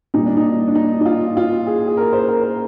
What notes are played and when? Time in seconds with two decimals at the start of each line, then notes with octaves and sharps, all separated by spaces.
0.14 A#2 G3 D#4
0.26 D4
0.37 D#4
0.67 D4
0.75 D#4
1.01 D#4
1.06 F4
1.37 F4
1.67 G#4
1.87 G#4
1.97 A#4
2.13 C5
2.28 A#4
2.44 A#4